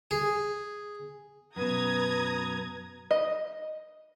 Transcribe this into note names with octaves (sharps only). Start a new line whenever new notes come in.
G#4
F#2 B2 B4 A#5 D#6 G#6
D#5